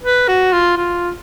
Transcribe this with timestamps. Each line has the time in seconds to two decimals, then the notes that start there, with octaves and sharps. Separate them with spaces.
0.03 B4
0.28 F#4
0.52 F4
0.77 F4